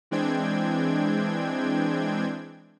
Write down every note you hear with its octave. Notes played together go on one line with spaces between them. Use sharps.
E3 G#3 C4 D4 G5 G#6